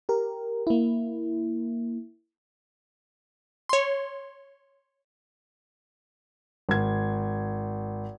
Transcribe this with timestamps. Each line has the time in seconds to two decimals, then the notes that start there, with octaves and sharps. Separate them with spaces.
0.09 G4 A#4
0.67 A#3 E4
3.69 C#5 C6
6.69 G#1 G#6